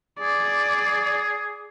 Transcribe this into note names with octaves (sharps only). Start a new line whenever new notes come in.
G#4 D5